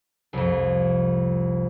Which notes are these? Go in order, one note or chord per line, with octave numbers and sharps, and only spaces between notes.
C2 F2